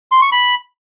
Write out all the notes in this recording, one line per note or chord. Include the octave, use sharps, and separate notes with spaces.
C6
C#6
B5